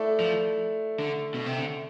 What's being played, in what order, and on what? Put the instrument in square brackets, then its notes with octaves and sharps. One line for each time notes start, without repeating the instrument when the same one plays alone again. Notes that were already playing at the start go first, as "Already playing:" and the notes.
Already playing: [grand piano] A3 E4 A4 D5
[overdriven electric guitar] F3
D3
B2
C3
D3